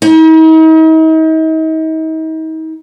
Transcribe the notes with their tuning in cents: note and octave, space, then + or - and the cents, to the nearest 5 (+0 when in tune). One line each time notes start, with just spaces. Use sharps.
D#4 +40